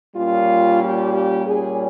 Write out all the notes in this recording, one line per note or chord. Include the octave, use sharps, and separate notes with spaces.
A#2 G3 A#3 C#4 F4
G4
G4
A#2 G3 C#4 G#4